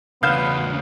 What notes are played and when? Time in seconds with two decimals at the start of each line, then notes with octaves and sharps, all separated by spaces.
0.23 E2 C#3 B3 F5 F#6 G6 E7